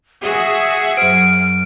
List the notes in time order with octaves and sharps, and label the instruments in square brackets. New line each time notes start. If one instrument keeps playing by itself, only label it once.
[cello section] F#4 G#4 [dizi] E5
[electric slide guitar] F#2 C5 [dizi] F6 [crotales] D7